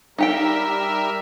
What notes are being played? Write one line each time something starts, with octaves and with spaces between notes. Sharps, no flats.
G3 D#4 G4 A#4 E5 G5